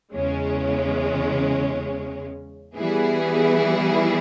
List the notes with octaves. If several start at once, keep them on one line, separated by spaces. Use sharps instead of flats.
E2 C#3 G#3 C#4
E3 G3 B3 E4 G#4